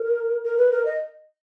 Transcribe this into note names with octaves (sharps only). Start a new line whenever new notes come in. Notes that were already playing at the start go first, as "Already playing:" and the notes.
Already playing: A#4
A#4
B4
A#4
D#5